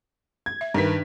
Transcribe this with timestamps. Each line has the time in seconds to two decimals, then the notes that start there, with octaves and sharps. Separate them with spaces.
0.46 G#6
0.61 E5
0.74 G2 D#3 D4 D#4 B4 B6